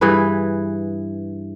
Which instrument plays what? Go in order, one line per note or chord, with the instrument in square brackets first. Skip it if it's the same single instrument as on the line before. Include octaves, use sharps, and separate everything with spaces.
[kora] G2 E3 G#4 B4